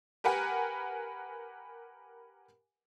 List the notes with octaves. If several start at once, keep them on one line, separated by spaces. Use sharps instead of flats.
G4 A#4 B4 F#5 G#5